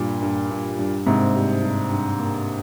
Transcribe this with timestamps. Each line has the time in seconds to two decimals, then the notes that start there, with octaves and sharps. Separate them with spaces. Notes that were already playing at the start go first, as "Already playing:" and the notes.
Already playing: G2 A#2 G3 A#3
0.22 G2
0.51 G2
0.79 G2
1.06 G#2 C3 A#3
1.35 G3
1.63 G2
1.91 G2
2.19 A#3